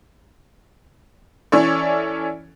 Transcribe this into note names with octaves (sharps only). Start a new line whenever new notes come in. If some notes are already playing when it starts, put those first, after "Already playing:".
E3 C#4 E4 A4 C#5 D5